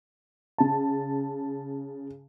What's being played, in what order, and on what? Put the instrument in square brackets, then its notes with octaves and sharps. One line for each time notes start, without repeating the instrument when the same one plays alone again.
[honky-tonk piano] C#3 A5